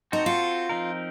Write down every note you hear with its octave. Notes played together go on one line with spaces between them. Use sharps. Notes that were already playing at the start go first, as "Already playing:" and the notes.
C4 D#4 F#4 A4 C5
F4
F3 C4 D#4 A#4